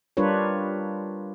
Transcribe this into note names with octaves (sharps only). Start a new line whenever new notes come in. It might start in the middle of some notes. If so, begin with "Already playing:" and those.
G3 D4 F4 A#4 B4 C#5